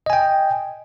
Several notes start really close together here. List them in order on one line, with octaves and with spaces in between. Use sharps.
D#5 G#5 G5